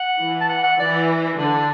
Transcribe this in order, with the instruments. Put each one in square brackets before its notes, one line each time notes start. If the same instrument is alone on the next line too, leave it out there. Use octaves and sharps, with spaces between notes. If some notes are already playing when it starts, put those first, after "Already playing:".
Already playing: [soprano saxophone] F#5
[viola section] E3
[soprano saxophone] A5
F#5
F#5
[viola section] E3 [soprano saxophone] D5
[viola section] D3 [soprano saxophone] D4